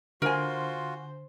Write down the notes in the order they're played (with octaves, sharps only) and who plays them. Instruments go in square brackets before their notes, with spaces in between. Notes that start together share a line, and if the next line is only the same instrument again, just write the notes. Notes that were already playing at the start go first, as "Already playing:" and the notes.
[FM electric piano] D3 [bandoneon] F4 F#4 [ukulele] A#4 G#5 [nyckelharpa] C5